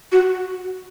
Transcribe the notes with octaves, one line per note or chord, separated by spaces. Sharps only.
F#4